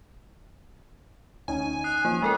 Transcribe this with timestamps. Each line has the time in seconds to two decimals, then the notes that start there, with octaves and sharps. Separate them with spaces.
1.48 D2 C#4 D#4 G#5
1.84 D#6 F#6 C7
2.05 F3 A#3
2.22 G#3 A4 A#4 G5